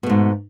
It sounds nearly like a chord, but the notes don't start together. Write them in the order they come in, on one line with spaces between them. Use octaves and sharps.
B2 A3 G#2